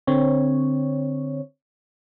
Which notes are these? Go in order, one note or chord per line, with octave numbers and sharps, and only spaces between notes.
D3 C4 C#5